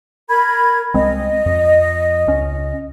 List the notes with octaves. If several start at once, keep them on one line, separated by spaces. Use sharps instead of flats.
A#4 B5 G#6
C2 G#3 C4 D#5
F2
C#2 C#4